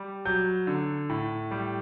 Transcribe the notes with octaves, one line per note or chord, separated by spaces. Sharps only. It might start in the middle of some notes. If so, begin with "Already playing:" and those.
Already playing: G3
F#3 G6
D3
A2
G3